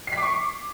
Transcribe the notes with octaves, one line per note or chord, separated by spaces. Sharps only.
C7
B6
D6
C#6